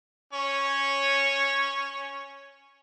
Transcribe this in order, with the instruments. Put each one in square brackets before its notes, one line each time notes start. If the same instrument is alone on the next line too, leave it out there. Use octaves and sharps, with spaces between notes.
[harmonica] C#4 C#5